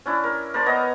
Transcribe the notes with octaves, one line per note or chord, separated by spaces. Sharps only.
C#4 D4 E4
A#4
A#4 C5 D5 A5
B3 C#5 D#5 A#5